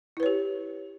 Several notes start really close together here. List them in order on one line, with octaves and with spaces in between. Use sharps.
E4 B4 C#5 G4